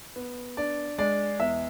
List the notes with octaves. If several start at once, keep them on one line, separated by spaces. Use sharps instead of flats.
B3
D4 D5
G#3 D5
E2 E5